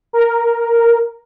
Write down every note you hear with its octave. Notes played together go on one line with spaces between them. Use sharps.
A#4